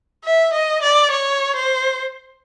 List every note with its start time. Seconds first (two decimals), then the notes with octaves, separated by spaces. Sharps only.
0.25 E5
0.53 D#5
0.82 D5
1.11 C#5
1.56 C5